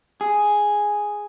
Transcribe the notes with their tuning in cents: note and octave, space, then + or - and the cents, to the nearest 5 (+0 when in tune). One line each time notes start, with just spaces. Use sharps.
G#4 +0